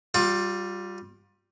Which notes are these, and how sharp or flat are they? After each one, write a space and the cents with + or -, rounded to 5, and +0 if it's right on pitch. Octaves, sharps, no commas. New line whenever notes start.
G3 -5 F4 +30